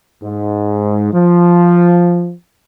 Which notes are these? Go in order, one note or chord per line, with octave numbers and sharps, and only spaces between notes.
G#2
F3